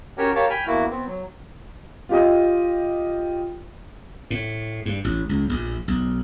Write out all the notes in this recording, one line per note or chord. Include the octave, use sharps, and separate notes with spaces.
C#4 F#4 G4 A#4 C#5
G4 A#4 C#5 F5 A5
G5 G#5 B5 F6
E2 A#3 E4 F#4
B3 C4
F#3
F4 G4 D#5
A2
G2
A1
C#2
A#1
B1